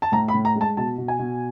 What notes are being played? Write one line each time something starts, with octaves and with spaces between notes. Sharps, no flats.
A5
A2 A#5
B5
A2
A#5
G#3
A5
B2 A5
B2
G#5
B2